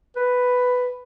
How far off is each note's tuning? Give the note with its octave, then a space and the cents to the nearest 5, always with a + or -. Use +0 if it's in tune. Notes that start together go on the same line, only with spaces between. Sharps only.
B4 +5